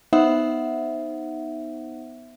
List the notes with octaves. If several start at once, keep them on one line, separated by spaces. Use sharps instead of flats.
B3 D#4 C5 E5 F#5